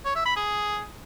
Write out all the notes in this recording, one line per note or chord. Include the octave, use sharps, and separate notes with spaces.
C#5
E5
B5
G#4